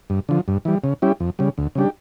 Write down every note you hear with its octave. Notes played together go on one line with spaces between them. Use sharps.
G2
D3 F3
G2
E3 G3
C#3
G3 C#4 E4 G4
F2
C#3 G3
D2
C#3 G3 D4 G4